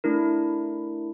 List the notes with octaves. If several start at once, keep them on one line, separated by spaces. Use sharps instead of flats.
A3 D4 E4 A#4